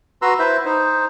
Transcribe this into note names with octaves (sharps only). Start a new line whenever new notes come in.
F#4 B4 A#5 C6 E6
E4 B4 C5 E5
D#4 C5